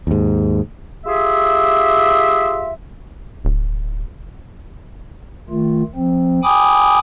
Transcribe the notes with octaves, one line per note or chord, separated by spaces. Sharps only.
D#2 G#2
F4 G4 G#4 E5
D1
D#3 A3 F4
F3 C4
G5 G#5 B5 D6 D#6